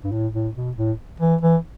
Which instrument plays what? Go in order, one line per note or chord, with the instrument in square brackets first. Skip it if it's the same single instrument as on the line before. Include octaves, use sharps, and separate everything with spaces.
[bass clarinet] G2
A2
A2
B2
A2
E3
E3